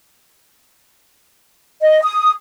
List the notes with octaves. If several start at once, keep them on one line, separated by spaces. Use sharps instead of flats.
D#5
D#6